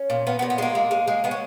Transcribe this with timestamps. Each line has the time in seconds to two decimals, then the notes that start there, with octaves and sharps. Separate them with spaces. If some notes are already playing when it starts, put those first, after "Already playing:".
Already playing: C#4
0.10 A#2
0.27 A#2 B3
0.39 B3
0.42 A#2
0.50 B3
0.58 G#3 A#3
0.75 G#3
0.91 G#3
1.08 G#3
1.24 G#3 B3
1.31 C#4